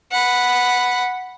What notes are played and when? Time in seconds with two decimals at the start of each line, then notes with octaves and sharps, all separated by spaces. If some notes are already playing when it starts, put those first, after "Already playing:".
0.11 F#5 B5